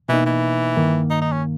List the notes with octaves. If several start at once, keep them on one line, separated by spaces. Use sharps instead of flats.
B2 E3 A#3 D#4
E3
G2 D#3 A#3
D#4
D#4
C#4